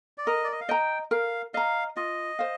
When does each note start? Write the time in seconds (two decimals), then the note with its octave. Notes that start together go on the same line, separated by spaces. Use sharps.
0.18 D5
0.26 A#4 D#5
0.44 D5
0.52 D#5
0.61 F5
0.69 D#5 G5 A#5
1.11 A#4 F5
1.54 D#5 F5 A#5
1.96 F4 D#5
2.39 C5 F5